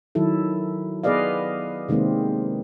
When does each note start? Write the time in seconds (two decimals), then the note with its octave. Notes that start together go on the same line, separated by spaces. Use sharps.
0.15 D#3 F#3 E4 A4
1.04 B3 G#4 B4 D5 D#5 F5
1.89 C3 D#3 G#3 A#3 C4